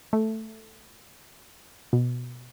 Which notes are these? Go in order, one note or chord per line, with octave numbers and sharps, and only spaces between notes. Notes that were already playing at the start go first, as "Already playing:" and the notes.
A3
B2